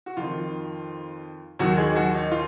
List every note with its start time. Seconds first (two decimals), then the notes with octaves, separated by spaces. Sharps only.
0.06 F#4
0.17 F2 D#3 F4
1.59 D#2 D#3 F#3 F#4
1.77 G#3 G#4
1.95 F#3 F#4
2.14 D#4
2.31 F4